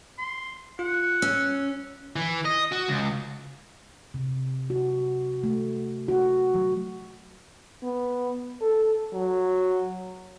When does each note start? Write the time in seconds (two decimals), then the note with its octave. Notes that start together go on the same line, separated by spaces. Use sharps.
0.19 C6
0.79 F4 F#5
1.22 C#4 E6
2.16 E3
2.45 D#5
2.72 F#4
2.89 C#2
4.14 C3
4.70 F#4
5.43 A3
6.08 F#4
6.54 F#3
7.83 B3
8.61 A4
9.14 F#3